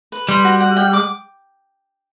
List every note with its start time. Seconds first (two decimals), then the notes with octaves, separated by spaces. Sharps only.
0.12 B4
0.29 G3 C6
0.44 F#4
0.60 F#5
0.77 G5
0.93 D6